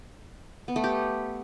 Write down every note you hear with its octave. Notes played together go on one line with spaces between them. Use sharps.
B3
A3
G4